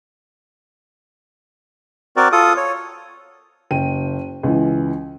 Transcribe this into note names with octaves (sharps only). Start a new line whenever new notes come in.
C4 F#4 A#4 D5
F4 A4 D#6
C#5
F#1 G5 D#7
C#2 E3